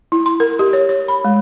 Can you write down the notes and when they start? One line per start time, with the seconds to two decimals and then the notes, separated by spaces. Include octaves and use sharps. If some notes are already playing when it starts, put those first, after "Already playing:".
0.12 E4
0.26 C6
0.40 A#4
0.59 G4
0.73 C#5
0.89 C#5
1.08 B5
1.24 G#3